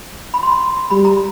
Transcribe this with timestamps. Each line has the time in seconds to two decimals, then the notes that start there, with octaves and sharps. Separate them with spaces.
0.34 B5
0.43 C6
0.52 B5
0.90 G3 B5
1.05 A#5